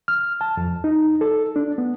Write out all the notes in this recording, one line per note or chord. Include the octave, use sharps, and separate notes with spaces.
F6
A5
F2
D#4
A4
D4
B3